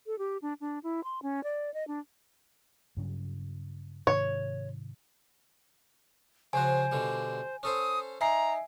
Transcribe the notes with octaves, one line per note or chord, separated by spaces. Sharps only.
A4
G4
D4
D4
E4
C6
C#4
D5
D#5
D4
G2 C#3 F#3
G#2 C3 D#3 C#5
C#3 F3 F#4 C5 G#5
B2 D3 G3
C#4 A4 C5 D#6
D#4 E5 G#5 A#5 C7